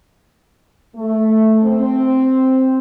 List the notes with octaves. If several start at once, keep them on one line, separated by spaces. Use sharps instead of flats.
A3
C4